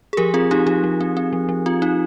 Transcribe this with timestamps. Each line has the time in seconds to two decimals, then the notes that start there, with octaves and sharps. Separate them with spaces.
0.13 G#4
0.17 F3 G4 A#4
0.34 C4 F4 G#4
0.51 C4 D#4 G4
0.67 F3 D#4 G4
0.84 F3
1.01 C4
1.17 C4
1.33 F3
1.49 F3
1.66 C4 F4
1.82 C4 D#4